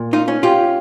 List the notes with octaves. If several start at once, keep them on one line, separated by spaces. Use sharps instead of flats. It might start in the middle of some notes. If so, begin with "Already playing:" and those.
Already playing: A#2
D#4 F4
C#4
F4 G4